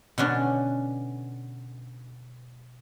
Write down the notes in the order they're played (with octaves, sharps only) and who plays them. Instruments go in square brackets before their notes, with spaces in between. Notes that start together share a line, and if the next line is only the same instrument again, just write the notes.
[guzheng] B2 D3 C#4 D4